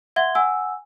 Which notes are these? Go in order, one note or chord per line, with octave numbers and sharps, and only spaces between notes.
E5 F#5 C6 G#6 G7
F#5 G#5 E6